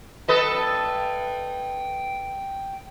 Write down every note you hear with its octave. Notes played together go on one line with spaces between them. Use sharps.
A4 B4 D#5 G5 A5